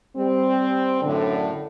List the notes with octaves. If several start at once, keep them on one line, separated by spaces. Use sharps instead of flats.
G3 C4
F#2 A2 D3